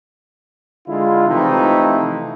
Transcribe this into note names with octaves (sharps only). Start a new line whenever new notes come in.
D3 G#3 E4 F4
C3 E3 F3 A3 D#4 E4